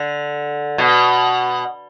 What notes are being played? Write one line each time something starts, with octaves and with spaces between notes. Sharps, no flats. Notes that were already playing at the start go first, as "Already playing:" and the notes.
Already playing: D3
B2